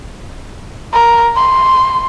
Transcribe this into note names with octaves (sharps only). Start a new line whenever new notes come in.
A#4
C6